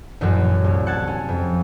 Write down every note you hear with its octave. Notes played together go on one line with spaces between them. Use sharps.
A1 F#2 A#2 F#3
C2
F#5 A5 G#6
C#4
F2